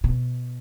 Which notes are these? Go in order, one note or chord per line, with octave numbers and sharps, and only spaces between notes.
B2